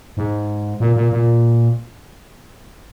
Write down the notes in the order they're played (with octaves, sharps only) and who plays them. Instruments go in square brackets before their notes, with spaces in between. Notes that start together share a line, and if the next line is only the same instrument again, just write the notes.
[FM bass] G#2
A#2
A#2
A#2